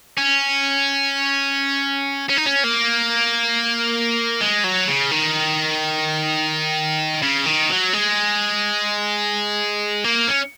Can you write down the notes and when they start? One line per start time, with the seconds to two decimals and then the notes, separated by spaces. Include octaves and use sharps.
0.18 C#4
2.30 C#4
2.37 D#4
2.46 C#4
2.64 A#3
4.41 G#3
4.64 F#3
4.88 C#3
5.11 D#3
7.22 C#3
7.46 D#3
7.70 F#3
7.93 G#3
10.04 A#3
10.27 C#4